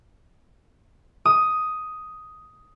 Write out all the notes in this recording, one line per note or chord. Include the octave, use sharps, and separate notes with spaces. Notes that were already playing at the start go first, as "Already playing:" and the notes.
D#6